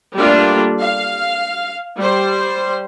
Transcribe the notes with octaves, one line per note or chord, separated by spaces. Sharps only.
G3 A3 A#3 D4 F4
F5
G3 C5